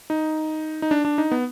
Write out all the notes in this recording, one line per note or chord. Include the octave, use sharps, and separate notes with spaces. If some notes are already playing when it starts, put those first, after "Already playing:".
D#4
D#4
D4
D4
D#4
B3